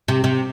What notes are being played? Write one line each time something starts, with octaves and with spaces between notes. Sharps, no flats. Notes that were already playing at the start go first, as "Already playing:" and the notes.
C3
C3